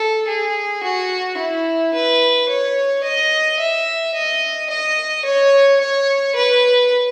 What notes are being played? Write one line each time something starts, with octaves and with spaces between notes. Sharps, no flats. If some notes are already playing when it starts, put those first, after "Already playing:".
Already playing: A4
G#4
F#4
E4
B4
C#5
D#5
E5
D#5
D#5
C#5
C#5
B4